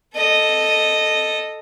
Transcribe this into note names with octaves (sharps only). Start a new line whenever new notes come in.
A4 D#5